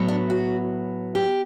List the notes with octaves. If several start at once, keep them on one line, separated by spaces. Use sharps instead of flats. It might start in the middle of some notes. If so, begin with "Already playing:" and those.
Already playing: A2 F#3 B3
D4
F#4
G4